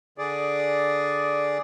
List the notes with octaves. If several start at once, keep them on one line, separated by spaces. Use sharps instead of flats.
D3 G#4 D5